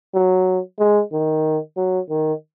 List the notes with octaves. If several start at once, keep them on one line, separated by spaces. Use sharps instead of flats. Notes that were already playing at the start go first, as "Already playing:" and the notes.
F#3
G#3
D#3
F#3
D#3